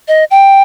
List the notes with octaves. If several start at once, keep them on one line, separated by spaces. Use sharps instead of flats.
D#5
G5